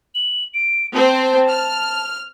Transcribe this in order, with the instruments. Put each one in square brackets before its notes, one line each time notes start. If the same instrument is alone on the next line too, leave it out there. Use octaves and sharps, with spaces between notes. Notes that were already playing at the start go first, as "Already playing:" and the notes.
[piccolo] F#7
D7
[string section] C4 C5 G5 [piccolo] A5
[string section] F6